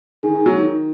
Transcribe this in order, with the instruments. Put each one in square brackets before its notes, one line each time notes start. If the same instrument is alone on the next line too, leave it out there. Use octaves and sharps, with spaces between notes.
[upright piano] D#3 [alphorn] G#4
[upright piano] D#3
F#3
D#3